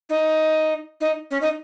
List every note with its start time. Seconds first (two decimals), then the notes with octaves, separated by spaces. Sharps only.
0.09 D#4
1.01 D#4
1.31 C#4
1.41 D#4